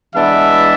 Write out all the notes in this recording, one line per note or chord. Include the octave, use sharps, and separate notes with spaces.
E3 G#3 B3 D4 E5